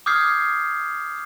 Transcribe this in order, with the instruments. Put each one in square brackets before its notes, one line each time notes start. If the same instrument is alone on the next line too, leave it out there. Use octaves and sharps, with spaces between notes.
[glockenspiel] D6 D#6 F6 G6 G#6 C7